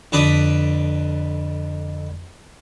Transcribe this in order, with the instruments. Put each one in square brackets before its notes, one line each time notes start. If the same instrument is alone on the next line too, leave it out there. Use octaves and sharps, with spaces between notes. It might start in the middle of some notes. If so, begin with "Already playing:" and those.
[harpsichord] F2 D3 D4 B4 B5 D#6